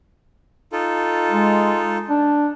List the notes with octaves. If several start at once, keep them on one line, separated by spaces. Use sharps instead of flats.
D#4 F4 A4
G#3
D4